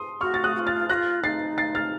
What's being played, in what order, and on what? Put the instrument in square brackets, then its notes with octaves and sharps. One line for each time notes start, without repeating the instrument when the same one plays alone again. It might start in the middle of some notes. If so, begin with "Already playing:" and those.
Already playing: [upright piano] C6 D#6
[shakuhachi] F#4 [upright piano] C#6 F6
[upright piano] A6
D#6 F#6
[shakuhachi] F#4
F4
[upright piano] F6 A6
[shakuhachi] F4 F#4 [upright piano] F#6 A#6
[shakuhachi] D#4 [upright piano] A6 C7
[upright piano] A6 C7
F6 A6